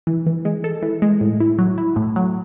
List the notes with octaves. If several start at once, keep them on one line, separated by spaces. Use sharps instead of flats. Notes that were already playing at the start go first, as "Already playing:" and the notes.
E3
E3
G#3
A4
E3
G#3
A2
E4
F#3
E4
A2
F#3